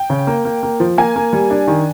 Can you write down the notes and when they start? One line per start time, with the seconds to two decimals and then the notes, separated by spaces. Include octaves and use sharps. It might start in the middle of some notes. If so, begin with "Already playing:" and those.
Already playing: G5
0.10 C#3
0.27 A#3
0.45 A#3
0.63 A#3
0.80 F3
0.98 A#3 G#5
1.16 A#3
1.33 G3
1.50 D4
1.68 D#3